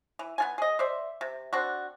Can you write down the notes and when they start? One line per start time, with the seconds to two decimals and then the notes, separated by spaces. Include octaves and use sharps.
0.19 E3
0.38 B3 F4 G#5
0.58 G#4 D#5
0.79 C5 D5 E5
1.21 C3
1.53 C4 D4 F#4